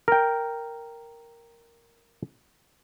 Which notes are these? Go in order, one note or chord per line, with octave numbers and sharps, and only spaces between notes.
A#4 G5